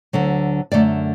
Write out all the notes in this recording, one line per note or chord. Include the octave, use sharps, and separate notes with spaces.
D2 D3 F#3
F#2 D3 A3 D5